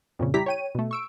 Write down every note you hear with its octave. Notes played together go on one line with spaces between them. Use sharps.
F2 A#2 C#3
G3 E4 G4 A#5 B6
C#5 G5 D#7
B2 A3
C#6 E6 D7